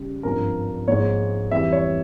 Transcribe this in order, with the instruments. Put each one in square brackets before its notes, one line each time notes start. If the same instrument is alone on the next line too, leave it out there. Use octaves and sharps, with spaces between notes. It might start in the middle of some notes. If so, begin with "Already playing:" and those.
Already playing: [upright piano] C#3 G3
G#1 G2 F3 A#4
A#1 G#2 F3 G#3 C#5
F2 E3 G3 E5
C#5